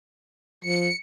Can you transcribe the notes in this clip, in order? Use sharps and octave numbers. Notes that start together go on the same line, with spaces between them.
F3 C#7